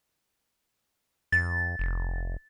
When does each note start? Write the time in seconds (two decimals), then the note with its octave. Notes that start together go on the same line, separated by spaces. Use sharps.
1.32 F2 A6
1.79 F1